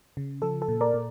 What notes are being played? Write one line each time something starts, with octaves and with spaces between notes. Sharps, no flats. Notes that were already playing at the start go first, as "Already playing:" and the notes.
C#3
F3 A4
A4
A#2
A#4 D5
A#2